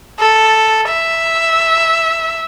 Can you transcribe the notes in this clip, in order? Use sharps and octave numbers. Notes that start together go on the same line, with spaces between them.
A4
E5